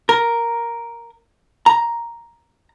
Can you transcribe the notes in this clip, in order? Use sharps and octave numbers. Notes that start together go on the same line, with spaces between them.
A#4
A#5